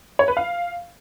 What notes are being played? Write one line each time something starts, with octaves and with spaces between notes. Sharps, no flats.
C#5
B4
F5